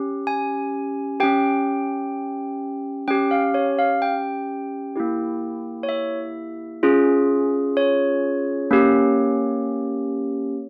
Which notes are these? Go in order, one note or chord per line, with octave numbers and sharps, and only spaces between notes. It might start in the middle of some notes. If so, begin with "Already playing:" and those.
Already playing: C#4 G4
G#5
C#4 G4 G5
C#4 G4 G5
F5
C#5
F5
G5
A#3 E4 G4
C#5
E5
C#4 F4 G#4
C#5
A#3 C#4 G4